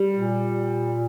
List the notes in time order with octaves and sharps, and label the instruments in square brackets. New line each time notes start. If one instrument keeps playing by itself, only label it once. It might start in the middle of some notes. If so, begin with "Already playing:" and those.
Already playing: [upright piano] G3
[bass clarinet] A#2